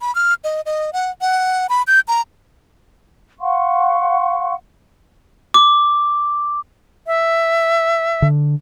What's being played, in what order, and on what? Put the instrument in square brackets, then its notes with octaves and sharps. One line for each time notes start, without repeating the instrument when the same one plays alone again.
[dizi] B5
F6
D#5
D#5
F#5
F#5
B5
G6
A#5
[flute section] F5 F#5 C6 C#6
[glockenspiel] D6
[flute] E5
[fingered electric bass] D3